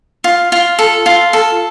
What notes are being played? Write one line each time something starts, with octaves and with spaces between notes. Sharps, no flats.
F4
F4
A4
F4
A4